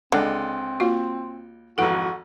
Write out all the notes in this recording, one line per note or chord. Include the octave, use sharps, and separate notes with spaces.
C#2 D3 G#3 C4 D5
A#3 F4 F#4
G#1 F2 E3 F#4 A4 F#5